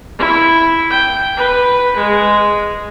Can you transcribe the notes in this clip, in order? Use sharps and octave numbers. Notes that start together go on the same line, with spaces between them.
E4
G5
B4
G#3